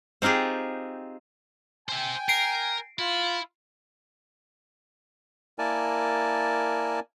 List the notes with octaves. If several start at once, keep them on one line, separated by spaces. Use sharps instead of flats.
C4 D#4 F4 G4 G#4
C5 E5 G5 G#5
A#4 C7 D7
E4 F4
A#3 E4 A#4 D5 G#5 A5